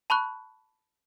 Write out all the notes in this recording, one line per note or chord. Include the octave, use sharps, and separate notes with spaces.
A5 B5 C#6 F#6